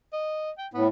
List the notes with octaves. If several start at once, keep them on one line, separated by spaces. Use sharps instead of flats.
D#5
G5
A2 B3